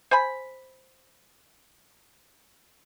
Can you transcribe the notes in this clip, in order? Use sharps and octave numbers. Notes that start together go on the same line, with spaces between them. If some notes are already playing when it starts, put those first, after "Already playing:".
C5 G#5 B5